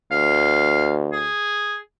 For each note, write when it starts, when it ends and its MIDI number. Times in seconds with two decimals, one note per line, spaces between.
0.12 1.29 38
0.12 0.93 77
1.12 1.77 68